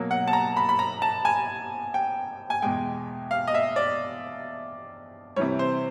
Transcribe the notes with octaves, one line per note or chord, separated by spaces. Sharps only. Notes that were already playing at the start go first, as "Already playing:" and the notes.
Already playing: B2 F#3 A#3
F#5
A5
A#5
B5
B5
A#5
A5
G#5
G5
G#5
E2 B2 G#3 G5
F5
D#5
E5
D5
C3 E3 G3 C#5
C5